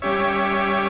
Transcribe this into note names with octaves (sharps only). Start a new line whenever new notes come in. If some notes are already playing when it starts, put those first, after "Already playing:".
G3 C#4 G4 C#5 E5